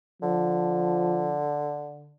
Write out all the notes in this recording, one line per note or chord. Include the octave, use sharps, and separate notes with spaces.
D3 F3